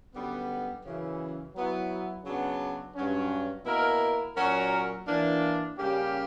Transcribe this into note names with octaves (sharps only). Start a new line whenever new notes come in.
F#2 D3 G3 B3
F#2 C#3 E3
F#3 B3 E4
C#3 F#3 B3 D4
G2 F#3 C#4
B2 A#3 E4 A#4
A#2 F#3 C#4 F#4 A#4
E3 A#3 D4
C#3 G3 A#3 C#4 G4